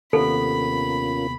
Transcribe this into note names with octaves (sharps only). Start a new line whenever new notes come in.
D#2 C3 B3 C#4 F4 A4 A#4 B5